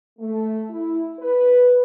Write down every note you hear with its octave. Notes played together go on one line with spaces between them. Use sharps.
A3
E4
B4